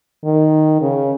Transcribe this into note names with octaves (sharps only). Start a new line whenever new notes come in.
D#3
C#3